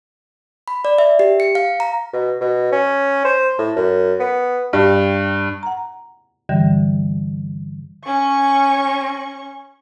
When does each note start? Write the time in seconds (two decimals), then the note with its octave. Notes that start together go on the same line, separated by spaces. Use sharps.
0.68 B5
0.85 D5
0.98 E5
1.19 G4
1.40 C#7
1.55 F5
1.80 A#5
2.13 B2
2.41 B2
2.72 C#4
3.24 C5
3.58 A2
3.76 F#2
4.20 B3
4.73 G2
5.63 F#5 A#5
6.49 G2 D3 E3 G3
8.04 C#4 C#6